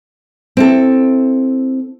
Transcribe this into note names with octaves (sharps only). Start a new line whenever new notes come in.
C4 E4 A4